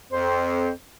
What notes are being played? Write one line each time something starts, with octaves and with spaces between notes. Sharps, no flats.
F2 C5